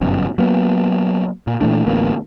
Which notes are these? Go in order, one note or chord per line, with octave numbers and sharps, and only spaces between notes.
G1 F#2 B2
F#3 A#3 B3
A#2
A#2 E3 A3 D4
A1 D2 A#3 B3